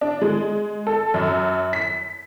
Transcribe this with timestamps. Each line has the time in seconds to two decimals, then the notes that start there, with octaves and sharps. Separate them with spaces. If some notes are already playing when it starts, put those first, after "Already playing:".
0.01 D4
0.22 G#3
0.87 A4
1.14 F#2
1.73 B6